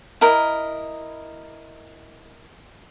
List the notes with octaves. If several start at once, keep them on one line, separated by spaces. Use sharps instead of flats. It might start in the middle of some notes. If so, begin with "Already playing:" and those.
E4 A#4 D#5